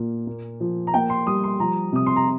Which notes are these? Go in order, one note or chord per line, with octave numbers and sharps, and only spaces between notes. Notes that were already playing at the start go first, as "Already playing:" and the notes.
Already playing: A#2 A#3
A#3
F3
A#5
A#3 G5
C6
G3 D#6
C6
F3 A#5
C3 D#6
C6
A#5